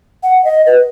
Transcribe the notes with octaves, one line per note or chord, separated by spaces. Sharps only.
F#5
D#5
B4